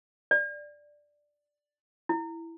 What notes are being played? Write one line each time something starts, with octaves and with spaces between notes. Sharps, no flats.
D5
E4